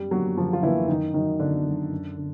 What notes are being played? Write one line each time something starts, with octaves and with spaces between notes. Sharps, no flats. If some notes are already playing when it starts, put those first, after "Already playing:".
Already playing: F#2 G3 G4
D3 F3 F#3 A#3 F#4
F#2 F3 F4
F4
D3 E3 F3 A#3 E4
F#2 D#3 D#4
D#3 F#3 D#4
F#2 D3 D4
D#3 F#3
F#2
D3